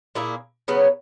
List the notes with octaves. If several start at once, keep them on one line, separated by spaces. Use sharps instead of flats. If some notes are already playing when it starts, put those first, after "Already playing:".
A#2 A#3 E4 G#4
C#3 F#3 B3